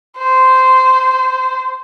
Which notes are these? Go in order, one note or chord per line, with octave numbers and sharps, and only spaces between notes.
C5